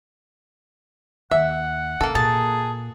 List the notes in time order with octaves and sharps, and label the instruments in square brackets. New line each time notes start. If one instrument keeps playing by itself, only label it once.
[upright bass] D#2 [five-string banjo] E5 [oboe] F#5
[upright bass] C#3 [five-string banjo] A#3 A4
[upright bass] A#2 [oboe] G#4 [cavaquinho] A5